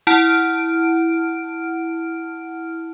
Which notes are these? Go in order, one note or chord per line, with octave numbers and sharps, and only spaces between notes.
E4 F#5 A5 F6 D7